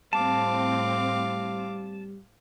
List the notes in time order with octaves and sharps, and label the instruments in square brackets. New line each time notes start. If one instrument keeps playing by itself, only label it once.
[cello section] A2 C4 [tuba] G3 [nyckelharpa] F5 D6 [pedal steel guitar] A5